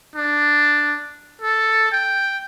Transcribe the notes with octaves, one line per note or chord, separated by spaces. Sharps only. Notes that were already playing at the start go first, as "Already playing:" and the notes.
D4
A4
G5